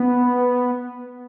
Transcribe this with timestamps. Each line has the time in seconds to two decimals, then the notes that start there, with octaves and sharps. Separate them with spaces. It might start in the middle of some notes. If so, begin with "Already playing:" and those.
Already playing: B3